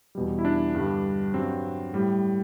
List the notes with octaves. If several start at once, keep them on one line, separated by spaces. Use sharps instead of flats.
E2 B2 G3
E4
D4
G2 D3 G3
G2 F#3 C4
A2 G3